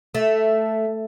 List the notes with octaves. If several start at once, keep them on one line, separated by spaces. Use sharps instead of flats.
A3